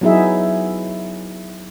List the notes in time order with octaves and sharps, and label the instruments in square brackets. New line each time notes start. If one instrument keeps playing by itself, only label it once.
[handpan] F#3 B3 D#4 E4 G#4 E5